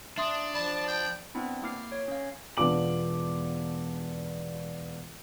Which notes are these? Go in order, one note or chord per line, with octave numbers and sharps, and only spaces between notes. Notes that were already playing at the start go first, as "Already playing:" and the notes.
D4 E5 C6 D#6
F3 D5 A5 B5
G5
B3 C4 D4 E4
A#3 E4 D6 F6 C7
C7
C#5
C#4 F5
E1 B3 D4 F4 D6 F#7